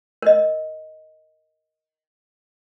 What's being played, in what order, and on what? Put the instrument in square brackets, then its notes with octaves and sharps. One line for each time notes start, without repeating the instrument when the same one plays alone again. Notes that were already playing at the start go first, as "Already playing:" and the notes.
[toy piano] A#4 D#5